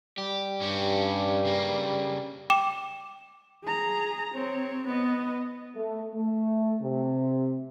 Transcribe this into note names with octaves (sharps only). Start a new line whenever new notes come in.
G3 G4
G2 C#4 G4
C#3 A#3
G5 D6 E7
G#4 A#5
C4 C#5
B3 D#5
A3
A3
C3